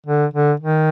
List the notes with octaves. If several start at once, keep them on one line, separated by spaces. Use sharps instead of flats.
D3
D3
D#3